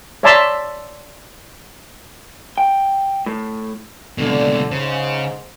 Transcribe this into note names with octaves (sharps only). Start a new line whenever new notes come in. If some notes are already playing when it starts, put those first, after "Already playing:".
C#5 D5 E5 A5 A#5 C6
G5
A2
C#2 B2 D3
G#2 C#3 C5